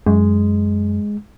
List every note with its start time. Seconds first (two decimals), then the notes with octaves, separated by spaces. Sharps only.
0.06 F#2 G#3